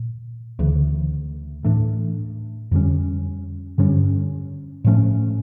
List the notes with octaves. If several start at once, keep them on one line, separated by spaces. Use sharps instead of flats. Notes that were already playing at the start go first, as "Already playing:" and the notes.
Already playing: A#2
D2 C#3 E3
A2 E3 A3 D4
F2 D3 G3 C#4
G2 D3 G3 C#4
A2 F3 A3 C#4